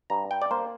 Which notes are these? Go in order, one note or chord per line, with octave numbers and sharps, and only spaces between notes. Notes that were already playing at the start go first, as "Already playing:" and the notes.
G2 A#5
G5
D5
A#3 C5